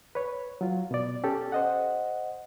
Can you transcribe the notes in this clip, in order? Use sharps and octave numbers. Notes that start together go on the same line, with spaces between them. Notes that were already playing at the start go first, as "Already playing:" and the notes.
B4 C#5
F#3 F4
B2 B3 D5
C#4 G4 A4
C5 D#5 F#5